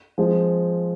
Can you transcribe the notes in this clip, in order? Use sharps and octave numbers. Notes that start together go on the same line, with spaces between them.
F3 G#3 C4